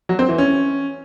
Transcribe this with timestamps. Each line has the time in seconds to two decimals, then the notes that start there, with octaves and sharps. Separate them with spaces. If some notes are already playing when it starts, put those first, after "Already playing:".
0.09 F#3
0.19 C4
0.29 E3
0.38 C#4